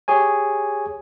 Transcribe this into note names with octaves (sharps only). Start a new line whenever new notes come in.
G4 G#4 C#5 G#5